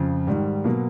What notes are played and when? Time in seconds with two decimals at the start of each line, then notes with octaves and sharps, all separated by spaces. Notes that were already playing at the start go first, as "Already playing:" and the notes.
Already playing: F2 C#3 F3
0.27 G#2 D#3 G3
0.64 B2 F#3 A#3